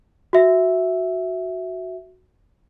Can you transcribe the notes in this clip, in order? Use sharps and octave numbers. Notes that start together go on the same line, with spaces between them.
F#4 E5